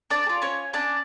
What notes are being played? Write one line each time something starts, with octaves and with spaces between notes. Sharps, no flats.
D4 D5
G#4
F4
C#4 C#5
C#4 D4 D5